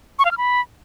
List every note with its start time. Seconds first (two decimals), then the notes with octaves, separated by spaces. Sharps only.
0.19 C#6
0.25 F5
0.31 F6
0.38 B5